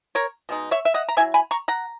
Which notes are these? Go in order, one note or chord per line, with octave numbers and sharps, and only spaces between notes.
A#4 C#5
B2 G#3 D#4
C#5 E5
E5
D#5 F#5
A#5
F#3 C#4 E4 E5 G#5
G#5 B5
A#5 C#6
F#5 A#5